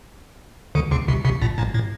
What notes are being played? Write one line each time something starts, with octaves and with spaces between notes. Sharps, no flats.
D2 D3
C#2 C#3
C2 C3
C2 C3
A#1 A#2
A1 A2
A2